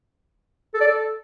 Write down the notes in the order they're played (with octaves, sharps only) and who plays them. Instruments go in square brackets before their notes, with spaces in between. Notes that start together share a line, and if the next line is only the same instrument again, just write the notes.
[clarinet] A4
D5
A4